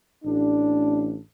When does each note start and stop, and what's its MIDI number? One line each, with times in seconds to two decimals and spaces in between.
0.24 1.18 33
0.24 1.18 62